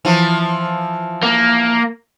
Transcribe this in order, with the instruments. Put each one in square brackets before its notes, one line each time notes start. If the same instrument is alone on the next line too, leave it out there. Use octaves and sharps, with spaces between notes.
[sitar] E3 F3
[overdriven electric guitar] A#3